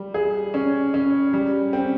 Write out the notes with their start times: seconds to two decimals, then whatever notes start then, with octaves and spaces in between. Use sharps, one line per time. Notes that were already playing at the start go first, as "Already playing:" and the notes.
Already playing: G3
0.14 G#4
0.54 C#4
0.94 C#4
1.33 G3
1.73 C4